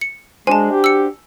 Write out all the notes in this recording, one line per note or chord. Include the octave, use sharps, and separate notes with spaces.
C#7
G#3 D4 F#4 C5 G#5 A5
G4
E6 C#7